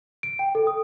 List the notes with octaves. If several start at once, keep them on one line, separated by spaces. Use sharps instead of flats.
D7
G5
A4
D#6